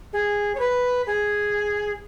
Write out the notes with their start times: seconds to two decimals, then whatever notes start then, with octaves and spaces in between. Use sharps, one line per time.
0.13 G#4
0.55 C#5
0.60 B4
1.07 G#4